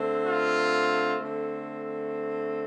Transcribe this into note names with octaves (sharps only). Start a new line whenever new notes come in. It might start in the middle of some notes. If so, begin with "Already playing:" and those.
Already playing: D3 A3 C4
F4
D3 A3 C4